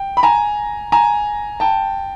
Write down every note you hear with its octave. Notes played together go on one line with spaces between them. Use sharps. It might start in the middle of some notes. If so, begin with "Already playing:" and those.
Already playing: G5
B5
G#5 A#5
G#5 A#5
G5 A5